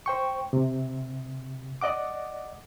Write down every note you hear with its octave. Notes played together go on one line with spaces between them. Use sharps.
C5 G5 C#6
C3
D5 D#5 F#5 D6